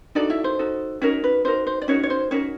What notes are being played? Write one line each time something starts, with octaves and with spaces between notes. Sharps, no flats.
D4 D#4 F#4 A4 D5
E4 E5
C5
D#4 F#4 A4
C#4 D#4 F#4 A#4 C#5
B4
D#4 F#4 A#4 C5
C5
D5
C#4 D#4 F#4 A#4 C#5
C#5
C5
C#4 D#4 F#4 A#4 C#5